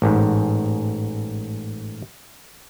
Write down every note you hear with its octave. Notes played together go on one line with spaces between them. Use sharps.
A1 G#2